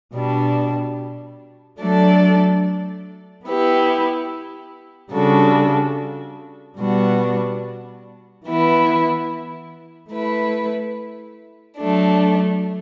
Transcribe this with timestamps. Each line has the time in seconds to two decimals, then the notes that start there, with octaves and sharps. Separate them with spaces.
0.14 B2 G3 D4
1.80 F#3 A3 D4 A4 D5
3.46 B3 E4 G4 B4
5.12 C#3 G3 D4 F#4 A4
6.79 B2 G3 B3 D4 F#4
8.46 E3 B3 E4 B4
10.12 A3 E4 B4
11.78 F#3 A3 D4